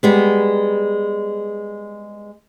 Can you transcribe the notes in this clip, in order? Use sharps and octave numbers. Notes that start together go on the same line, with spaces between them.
G3 G#3 B3